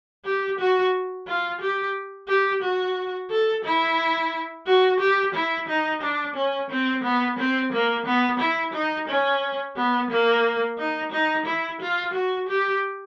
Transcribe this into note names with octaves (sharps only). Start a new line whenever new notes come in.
G4
F#4
F4
G4
G4
F#4
A4
E4
F#4
G4
E4
D#4
D4
C#4
C4
B3
C4
A#3
B3
E4
D#4
C#4
B3
A#3
D#4
D#4
E4
F4
F#4
G4